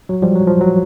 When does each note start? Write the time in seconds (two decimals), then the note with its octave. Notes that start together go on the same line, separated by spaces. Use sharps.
0.09 F#3
0.22 F3 G3
0.35 F#3
0.47 F3
0.61 F#3